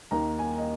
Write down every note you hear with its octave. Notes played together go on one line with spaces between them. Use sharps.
D#2 D#3 A#3 A#5
G#5
D#5